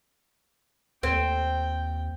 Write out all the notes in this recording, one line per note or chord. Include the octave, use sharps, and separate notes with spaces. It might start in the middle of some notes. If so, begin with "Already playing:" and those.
D#2 C4 G5